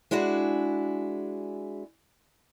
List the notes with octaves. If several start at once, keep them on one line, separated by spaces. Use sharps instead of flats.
G#3 D4 E4 F#4 G#4